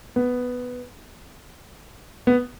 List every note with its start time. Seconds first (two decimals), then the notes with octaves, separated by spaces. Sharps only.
0.16 B3
2.27 B3